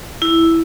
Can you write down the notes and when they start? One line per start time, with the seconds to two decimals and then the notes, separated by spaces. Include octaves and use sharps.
0.22 E4